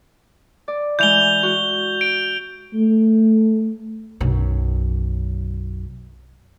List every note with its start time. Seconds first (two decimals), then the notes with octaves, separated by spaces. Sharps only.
0.68 D5
0.99 E3 G#3 G6 F7 G7
1.43 F#4
2.01 D7
2.74 A3
4.20 B1 F#2